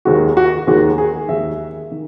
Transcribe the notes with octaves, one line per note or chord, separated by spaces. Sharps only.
D#2 D#3 G#3 F#4
F#4
D#2 D#3 G#3 F#4
G#4
D#2 D#3 G#3 E5
D#3